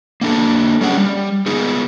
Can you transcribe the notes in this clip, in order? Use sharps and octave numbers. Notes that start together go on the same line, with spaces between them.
A#3 D4 A4
G3 C#4 G#4 F#5
G3
B3 D#4 G#4